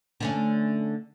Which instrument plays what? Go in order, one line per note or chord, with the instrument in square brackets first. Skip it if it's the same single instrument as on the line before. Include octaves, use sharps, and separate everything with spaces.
[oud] D3 A3 C#4